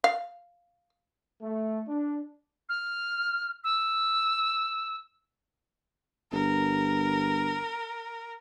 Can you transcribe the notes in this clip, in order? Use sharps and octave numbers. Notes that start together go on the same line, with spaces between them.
F5
A3
D4
F6
E6
G1 A#4